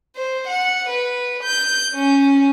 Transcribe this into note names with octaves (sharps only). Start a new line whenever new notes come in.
C5
F#5
B4
G6
C#4